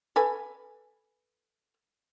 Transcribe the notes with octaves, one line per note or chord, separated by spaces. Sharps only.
A4 B4 G#5